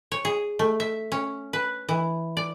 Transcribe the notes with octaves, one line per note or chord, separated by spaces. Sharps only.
C#5
G#4
A3
E5
C#4
B4
E3
D5